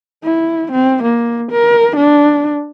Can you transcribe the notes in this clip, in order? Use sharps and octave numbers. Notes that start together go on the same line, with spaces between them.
E4
C4
A#3
A#4
D4